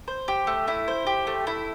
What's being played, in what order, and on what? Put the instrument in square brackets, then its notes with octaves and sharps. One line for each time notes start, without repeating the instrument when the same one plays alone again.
[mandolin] C5
G4
A3
E4
C5
G4
A3
E4